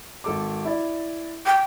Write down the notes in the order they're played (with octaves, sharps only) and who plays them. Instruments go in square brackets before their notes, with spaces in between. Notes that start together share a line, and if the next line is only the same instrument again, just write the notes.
[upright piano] G#1 A4 D6
E4 D5
[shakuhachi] G5